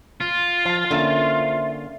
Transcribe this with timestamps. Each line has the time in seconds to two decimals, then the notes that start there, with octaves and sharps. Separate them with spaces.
0.21 F4
0.65 F3 F5 A5
0.91 D3 A#3 C#4 E4 C5 C#5